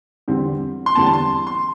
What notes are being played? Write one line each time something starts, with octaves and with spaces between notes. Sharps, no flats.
E2 D3 G3 C4
C6
E2 D3 G3 C4 A5
A5
C6
C6